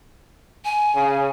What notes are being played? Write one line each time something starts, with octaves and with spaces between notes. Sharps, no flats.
G#5
C#3